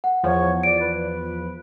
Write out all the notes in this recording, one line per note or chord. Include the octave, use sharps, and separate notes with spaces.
F#5
E2 F3 C#5
D5 D7
B4